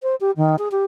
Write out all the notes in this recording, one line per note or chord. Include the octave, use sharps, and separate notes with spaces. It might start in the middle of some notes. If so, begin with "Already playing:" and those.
C5
G4
D#3
G#4
G4